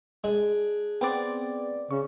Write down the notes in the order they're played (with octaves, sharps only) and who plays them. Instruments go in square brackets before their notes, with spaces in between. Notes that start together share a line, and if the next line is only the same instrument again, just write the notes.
[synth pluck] G#3 [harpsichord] D4 G#4
[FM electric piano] B3 C4 D5 [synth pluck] G5
[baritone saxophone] C#3 [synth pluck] C#6